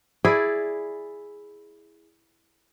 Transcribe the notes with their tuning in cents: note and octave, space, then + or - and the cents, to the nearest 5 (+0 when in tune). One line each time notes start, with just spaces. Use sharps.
E4 +0 G#4 +0 D5 +0